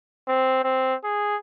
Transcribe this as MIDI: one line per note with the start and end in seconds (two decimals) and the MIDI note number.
0.28 0.60 60
0.64 0.95 60
1.04 1.36 68